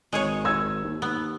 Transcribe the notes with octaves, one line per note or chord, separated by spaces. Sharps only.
G#1 G#3 G#4 C#5
E6 G#6
D#2
B3